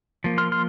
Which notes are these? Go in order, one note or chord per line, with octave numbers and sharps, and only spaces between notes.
F3 A#3
C6 F6
C6 F6